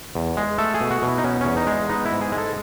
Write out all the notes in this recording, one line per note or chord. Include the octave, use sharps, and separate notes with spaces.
E2
G#3
A3 A4
G#4
B2
F#4
B2
E4
D#4
B3 C#4
E2 C#4
D#4
G#3
B3 D#4
E4
G#2
G#4
G#3
A4